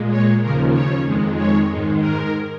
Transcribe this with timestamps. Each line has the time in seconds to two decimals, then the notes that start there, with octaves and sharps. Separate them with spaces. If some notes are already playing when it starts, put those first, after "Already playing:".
Already playing: A#2 G#3
0.10 C#5
0.41 D#2 C#3 F3 A#4
0.73 C#5
1.05 F2 D#3 G#3
1.37 C#5
1.69 G#2 D#3 G#3
2.00 A#4